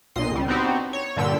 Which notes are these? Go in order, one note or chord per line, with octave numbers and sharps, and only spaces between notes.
B1 A#2 D#5 C6 C7
C#2 G3
B3 C4 D4 D#4 F#4 G4
C#5
G2 A#2 D3 G5 E6 B6